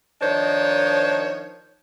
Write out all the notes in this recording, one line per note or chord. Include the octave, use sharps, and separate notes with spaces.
D#3 F3 D4 D#4 C5 C#5